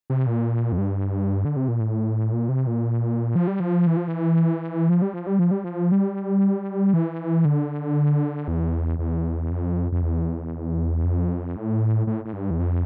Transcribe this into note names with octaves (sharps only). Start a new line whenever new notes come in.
C3
A#2
F2
G2
D3
C3
A#2
A2
A#2
C3
A#2
F3
G3
F3
E3
F3
E3
F3
G3
F3
G3
F3
G3
F3
G3
E3
D3
E2
E2
F2
F2
E2
F2
A2
A2
A2
G2
E2
F2